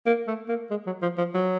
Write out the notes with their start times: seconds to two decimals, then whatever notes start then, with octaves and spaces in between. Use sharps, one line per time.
0.06 A#3
0.27 A3
0.48 A#3
0.70 G#3
0.86 F#3
1.02 F3
1.18 F3
1.34 F#3